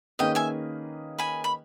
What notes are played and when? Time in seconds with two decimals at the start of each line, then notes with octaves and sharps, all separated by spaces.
0.19 D#3 A#3 C#4 G#4 B4 D#5 G5
0.35 E5 G#5
1.18 G#5 B5
1.44 B5